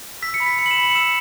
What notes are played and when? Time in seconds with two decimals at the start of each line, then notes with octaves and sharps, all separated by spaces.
0.22 E6 B6
0.34 C#7
0.40 B5
0.46 B6
0.59 B5 C#7
0.66 F#7
0.71 E7
0.77 B5
0.83 F#7
0.90 C#7
0.95 E6 E7